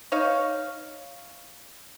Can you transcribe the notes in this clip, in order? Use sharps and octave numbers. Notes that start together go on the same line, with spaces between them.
D#4 C#5 F5